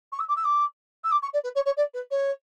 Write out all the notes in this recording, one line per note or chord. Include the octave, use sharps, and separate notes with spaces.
C#6
E6
D6
E6
D6
E6
D6
C#6
D5
B4
C#5
C#5
D5
B4
C#5